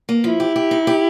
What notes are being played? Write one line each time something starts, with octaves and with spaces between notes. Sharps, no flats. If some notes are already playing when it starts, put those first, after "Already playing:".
A#3
F3 E4
G4
G4
D#4
G4